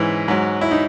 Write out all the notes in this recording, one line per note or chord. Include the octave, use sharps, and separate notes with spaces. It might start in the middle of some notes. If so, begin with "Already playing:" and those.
Already playing: G#2 E3 C#4
G#2 F#3
E4
D#4